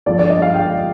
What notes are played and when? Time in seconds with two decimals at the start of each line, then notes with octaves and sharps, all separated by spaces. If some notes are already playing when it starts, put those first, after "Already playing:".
0.06 G1 G2 D3 F3 D5
0.19 D5
0.30 D#5
0.42 F5
0.54 G5